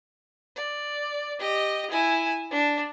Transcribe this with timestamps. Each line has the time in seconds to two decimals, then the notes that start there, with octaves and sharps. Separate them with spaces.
0.56 D5
1.39 G4 D#5
1.90 E4 G#5
2.51 D4